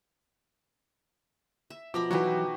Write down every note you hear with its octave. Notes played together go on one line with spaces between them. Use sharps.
E5
B2 F3 A#5 B5 D6
E3 F#3 D#4 E4 F#4 G4 B4